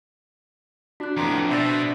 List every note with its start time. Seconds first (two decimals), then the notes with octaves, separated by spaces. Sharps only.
1.00 D4 F#4 F#6
1.17 F2 A2 B3 A#5 C6 D6
1.50 B2 C5 D5 E5 B5 A6